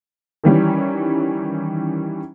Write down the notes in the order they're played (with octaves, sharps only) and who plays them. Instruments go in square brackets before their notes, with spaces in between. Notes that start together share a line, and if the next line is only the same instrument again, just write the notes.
[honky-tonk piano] D#3 E3 G3 C#4